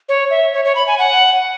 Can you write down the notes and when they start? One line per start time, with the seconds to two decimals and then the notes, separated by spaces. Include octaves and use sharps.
0.09 C#5
0.31 E5
0.53 C#5
0.65 C#5
0.75 B5
0.87 G#5
0.98 F#5